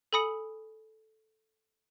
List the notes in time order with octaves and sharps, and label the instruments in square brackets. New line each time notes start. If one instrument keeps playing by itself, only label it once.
[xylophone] A4 G#5 B5 D#6 C#7